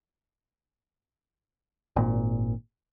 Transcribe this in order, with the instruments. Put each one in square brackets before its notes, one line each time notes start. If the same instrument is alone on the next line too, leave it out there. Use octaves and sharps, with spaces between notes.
[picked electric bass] G#1 A#2